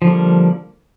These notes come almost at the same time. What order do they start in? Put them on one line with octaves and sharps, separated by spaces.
F3 D3 G3 A#3